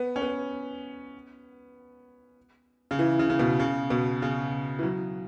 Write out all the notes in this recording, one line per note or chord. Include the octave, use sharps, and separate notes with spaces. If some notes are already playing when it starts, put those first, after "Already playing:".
Already playing: B3
C#4
B3
C#3
E3
C#3
C#3
B2
C#3
B2
C#3
E3
F#3